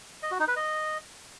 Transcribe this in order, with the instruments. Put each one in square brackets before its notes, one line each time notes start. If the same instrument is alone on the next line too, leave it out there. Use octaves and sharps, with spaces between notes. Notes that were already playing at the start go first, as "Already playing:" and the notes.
[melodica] D#5
F#4
D#4
B4
D#5